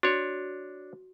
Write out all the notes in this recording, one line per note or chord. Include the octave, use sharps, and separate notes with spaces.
D4 F#4 C#5